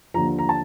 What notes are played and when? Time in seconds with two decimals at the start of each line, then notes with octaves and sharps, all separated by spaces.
0.14 D#2 D3 F3 A#5
0.39 A#5
0.49 A5